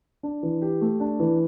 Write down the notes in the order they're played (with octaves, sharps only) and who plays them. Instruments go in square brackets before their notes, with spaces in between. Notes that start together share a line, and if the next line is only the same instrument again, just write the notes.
[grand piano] D4
E3
G4
A3
D4
E3